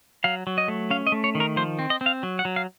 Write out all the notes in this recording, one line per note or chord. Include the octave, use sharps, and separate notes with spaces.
F#3 F5
F#3
D#5
A3
C#4 F5
D#5
A3
C#5
D#3
A#4
F3 C5
C4
D#5
C4
F5
F#3
F#5
F#3
F5